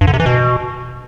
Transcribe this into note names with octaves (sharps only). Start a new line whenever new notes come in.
G2
D3
C3
E3
B2